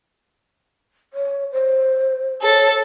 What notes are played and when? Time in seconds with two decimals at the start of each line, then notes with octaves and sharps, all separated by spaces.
1.13 C#5
1.52 C5
2.42 A4 C#5 A6